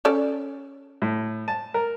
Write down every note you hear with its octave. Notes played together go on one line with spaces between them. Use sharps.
C#4 A4 D5
A2
A5
A#4